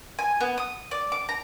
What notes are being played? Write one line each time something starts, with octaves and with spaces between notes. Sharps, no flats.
G#5
B3
D#6
D5
D6
A#5